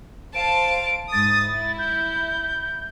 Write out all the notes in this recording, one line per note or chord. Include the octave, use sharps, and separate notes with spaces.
C5 F5 A5 D7
G#2 D#6 A6
E4
G6